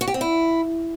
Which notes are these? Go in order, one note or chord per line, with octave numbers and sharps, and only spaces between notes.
F#4
G4
C4
E4